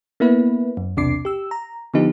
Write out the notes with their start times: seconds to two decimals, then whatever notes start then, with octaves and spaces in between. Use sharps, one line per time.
0.20 A#3 B3 E4 B4
0.77 F#2
0.97 B1 E2 C3 D4 D6 C7
1.25 G4 E6
1.51 A#5
1.94 D3 F3 B3 D#4 G4